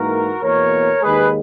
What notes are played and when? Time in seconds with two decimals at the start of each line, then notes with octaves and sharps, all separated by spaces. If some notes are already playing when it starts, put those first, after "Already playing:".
Already playing: G#2 E3 A#3 F#4 A#4
0.42 E2 B2 A#3 A#4 C#5
1.02 D#2 D#3 G#3 G#4 B4